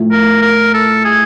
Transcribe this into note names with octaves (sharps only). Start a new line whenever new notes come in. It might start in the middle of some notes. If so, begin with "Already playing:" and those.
Already playing: A2 F3 A3
A#4
A#4
A4
G#4